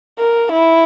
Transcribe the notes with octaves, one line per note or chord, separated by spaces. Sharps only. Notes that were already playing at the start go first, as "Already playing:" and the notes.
A#4
E4